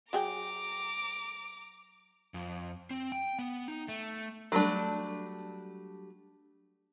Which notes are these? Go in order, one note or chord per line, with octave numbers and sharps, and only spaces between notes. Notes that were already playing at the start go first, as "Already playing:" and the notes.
F#3 G#4 G5 A#5 D6
F2
C4
G5
B3
D#4
A3
F#3 G3 A3 D4